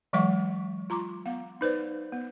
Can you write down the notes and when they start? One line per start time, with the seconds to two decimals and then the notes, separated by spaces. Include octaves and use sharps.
0.13 E3 F#3 G#3 D#5 F#5 C#6
0.90 F4 A#5 C6 D6
1.26 B3 F5
1.61 D#4 B4 C5 D5
2.12 B3